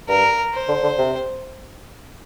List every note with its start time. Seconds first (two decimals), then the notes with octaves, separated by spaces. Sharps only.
0.08 G2 A#4
0.54 C5
0.68 D3
0.83 D3
0.98 C3